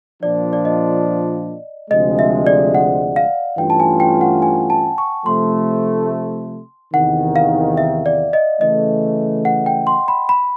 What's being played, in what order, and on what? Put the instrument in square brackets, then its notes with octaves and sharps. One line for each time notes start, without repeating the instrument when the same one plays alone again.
[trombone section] A#2 F3 A#3 D4 F4 [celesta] D5
[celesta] D5
D#5
[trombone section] D2 C3 F3 G#3 [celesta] D#5
[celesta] E5
D5
F#5
F5
[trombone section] G2 E3 A3 C#4 F4 [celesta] G5
[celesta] A5
G#5
G5
F#5
G#5
A5
C#6
[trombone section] C3 F3 A3 [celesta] C6
[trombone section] E2 C3 D#3 [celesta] F#5
[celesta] F5
E5
D5
D#5
[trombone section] C#3 E3 A3 [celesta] D#5
[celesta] F#5
G5
C6
B5
B5